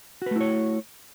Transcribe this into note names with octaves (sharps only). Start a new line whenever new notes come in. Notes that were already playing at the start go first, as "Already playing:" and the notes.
A3 E4 F#4 B4 C#5